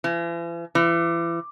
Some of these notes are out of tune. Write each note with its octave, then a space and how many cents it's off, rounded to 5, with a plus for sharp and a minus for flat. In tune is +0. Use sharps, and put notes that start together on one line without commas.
E3 +45
E3 +35